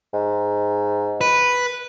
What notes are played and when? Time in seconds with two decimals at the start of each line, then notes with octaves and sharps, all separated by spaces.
0.14 G#2
1.21 B4